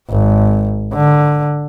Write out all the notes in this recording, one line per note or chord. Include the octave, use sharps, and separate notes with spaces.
G#1
D3